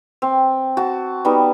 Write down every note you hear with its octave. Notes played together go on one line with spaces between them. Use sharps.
C4
F#4 A5
G3 B3 D#4